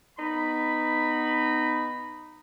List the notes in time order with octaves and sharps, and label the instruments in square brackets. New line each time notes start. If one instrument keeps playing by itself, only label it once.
[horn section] B3 D#4 B5